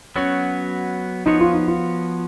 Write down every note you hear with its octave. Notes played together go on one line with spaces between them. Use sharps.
F#3 B3 C#4 F#4 C#5
F3 B3 D#4 F#4 C#5
F4
D#4
F4